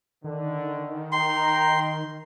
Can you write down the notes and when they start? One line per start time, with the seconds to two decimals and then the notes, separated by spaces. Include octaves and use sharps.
0.24 D3 D#3
1.12 G5 A#5 C6